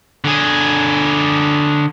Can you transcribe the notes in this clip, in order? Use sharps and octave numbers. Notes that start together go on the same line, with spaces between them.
D3 G#4